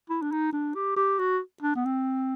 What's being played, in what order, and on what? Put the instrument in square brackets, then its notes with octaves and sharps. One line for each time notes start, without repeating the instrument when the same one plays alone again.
[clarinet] E4
D4
D#4
D4
G4
G4
F#4
D4
B3
C4